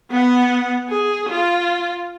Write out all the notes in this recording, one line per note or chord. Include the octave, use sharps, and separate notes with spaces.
B3 F#5
G#4
F4